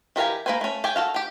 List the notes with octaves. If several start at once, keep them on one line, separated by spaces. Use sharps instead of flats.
E3 G4 A#4 F5 G#5
A#3 A4 B4 C5 G#5
A3 C#4
G4 G5 G#5
F#4 A4 F5
G4 G5